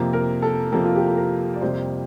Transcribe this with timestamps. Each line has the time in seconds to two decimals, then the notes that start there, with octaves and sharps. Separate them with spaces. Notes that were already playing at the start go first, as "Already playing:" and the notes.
Already playing: F2 C3 F3 A#3
0.13 A#4
0.42 A4
0.72 F2 C3 F3 A#3 A4
0.85 F4
0.96 G4
1.06 A4
1.17 A#4
1.54 D5
1.61 F2 C3 G3 A#3 C5